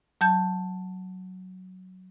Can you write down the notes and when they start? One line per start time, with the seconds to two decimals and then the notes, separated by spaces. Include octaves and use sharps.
0.21 F#3 A5 G6